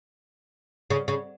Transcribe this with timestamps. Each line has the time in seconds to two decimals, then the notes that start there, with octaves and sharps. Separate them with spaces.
0.90 C#3
1.08 C#3